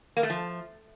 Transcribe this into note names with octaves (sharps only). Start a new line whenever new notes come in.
A#3
A3
F3